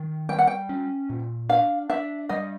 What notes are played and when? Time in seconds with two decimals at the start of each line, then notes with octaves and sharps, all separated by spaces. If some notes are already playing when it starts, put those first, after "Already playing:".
Already playing: D#3
0.29 G3 G5
0.38 F#5
0.47 G5
0.69 C#4
1.10 A#2
1.49 D4 F5
1.90 D4 E5
2.29 G3 D#5